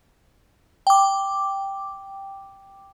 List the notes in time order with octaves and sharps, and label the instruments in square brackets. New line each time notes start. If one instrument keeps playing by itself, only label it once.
[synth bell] G5 D6